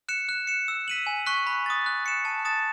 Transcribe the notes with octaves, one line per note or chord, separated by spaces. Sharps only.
F#6 C#7 E7
F#6
C#7 E7
E6
B6 D#7 F#7
G#5
C#6 F#6 B6
B5
D#6 A6
F#6
C#7 E7
A5
D#6 A6 E7